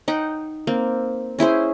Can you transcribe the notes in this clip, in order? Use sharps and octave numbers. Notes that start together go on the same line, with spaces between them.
D#4 F#5 G5
A#3 C4
C#4 E4 G#4 C5